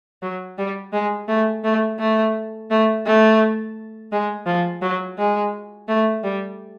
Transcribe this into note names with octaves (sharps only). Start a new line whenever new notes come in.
F#3
G3
G#3
A3
A3
A3
A3
A3
G#3
F3
F#3
G#3
A3
G3